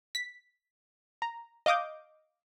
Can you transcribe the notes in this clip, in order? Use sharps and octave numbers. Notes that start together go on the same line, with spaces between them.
B6
A#5
D#5 F5 D6 D#6 G6